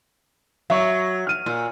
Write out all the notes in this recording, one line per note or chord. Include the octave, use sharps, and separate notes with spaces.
F#3 E5 C#6
F6 D#7
A#2